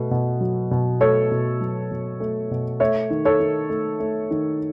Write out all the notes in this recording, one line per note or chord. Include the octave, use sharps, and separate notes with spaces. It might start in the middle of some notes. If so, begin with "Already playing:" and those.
Already playing: B2 A3
B2
F#3
B2
A3 A4 C#5
B2
F#3
B2
A3
B2
A3 C#5 E5
D#3
A4 C#5
D#3
A3
A3
D#3